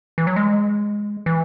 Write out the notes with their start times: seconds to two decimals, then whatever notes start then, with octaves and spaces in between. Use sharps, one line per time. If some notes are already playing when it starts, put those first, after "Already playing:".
0.18 E3
0.27 F#3
0.36 G#3
1.26 E3